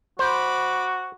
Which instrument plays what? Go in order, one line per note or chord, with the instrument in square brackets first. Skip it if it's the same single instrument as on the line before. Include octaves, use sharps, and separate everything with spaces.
[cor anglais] F#4 [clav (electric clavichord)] C5 [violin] B5 D6